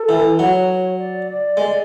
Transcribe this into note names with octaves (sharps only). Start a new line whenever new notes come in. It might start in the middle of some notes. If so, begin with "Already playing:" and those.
Already playing: A4
E3
F#3 C#5
D5
G#3